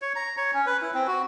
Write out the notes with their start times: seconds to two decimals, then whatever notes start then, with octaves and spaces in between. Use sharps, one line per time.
0.02 C#5
0.16 A#5
0.37 C#5
0.54 C#4
0.66 B4
0.82 E4
0.94 C4
1.07 F#4